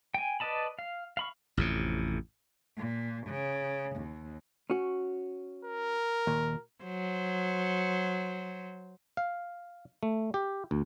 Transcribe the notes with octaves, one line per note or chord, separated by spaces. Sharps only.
G5 G#5
B4 D5 D#5 A5 B5
F5
F5 B5 C#6
A1 F2 C3
A#2
C#3
D#2
C#4 F#4
A#4
D#2 A#2
F#3 C5
F5
A3
G4
D2